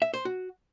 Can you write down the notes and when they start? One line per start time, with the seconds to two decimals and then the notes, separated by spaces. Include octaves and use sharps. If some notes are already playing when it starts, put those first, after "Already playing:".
0.02 E5
0.14 C5
0.25 F#4